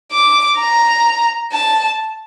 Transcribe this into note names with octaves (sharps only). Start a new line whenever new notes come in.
D6
A#5
A5